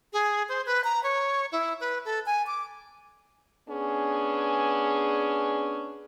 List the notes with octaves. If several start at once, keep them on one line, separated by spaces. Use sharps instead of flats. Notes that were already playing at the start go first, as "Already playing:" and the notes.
G#4
C5
B4
A#5
C#5
E4
B4
A4
G#5
D6
B3 C#4 D4 G#4